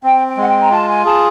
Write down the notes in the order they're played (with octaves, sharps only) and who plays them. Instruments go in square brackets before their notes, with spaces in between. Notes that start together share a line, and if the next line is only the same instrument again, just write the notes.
[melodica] C4 [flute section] G5
[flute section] G5
[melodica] G#3 [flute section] F#5
[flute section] G5
A#5
[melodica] F4 [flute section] A5
[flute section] G#5
[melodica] G#4 [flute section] A5